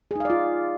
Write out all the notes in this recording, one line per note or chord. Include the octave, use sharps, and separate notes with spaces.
D#4 F4 G#4 D5 F5